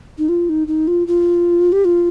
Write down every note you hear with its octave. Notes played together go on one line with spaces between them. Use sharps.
D#4
F4
D#4
D#4
F4
F4
G4
F4